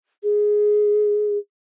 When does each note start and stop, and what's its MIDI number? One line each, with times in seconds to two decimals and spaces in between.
0.23 1.38 68